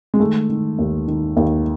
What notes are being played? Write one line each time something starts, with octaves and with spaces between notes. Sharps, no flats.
G#3
D#3 A3
D#3
D#2
D#3
D#2